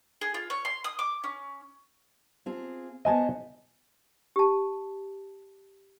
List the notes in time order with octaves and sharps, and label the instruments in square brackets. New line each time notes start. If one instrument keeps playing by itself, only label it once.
[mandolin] G#4
F4
C#5
C6
D#6
D6
C#4
[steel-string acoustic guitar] C4 F4 G#4
[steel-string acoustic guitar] B3 F#4 C5 [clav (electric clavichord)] D#5 G#5 A5
[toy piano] G4 A5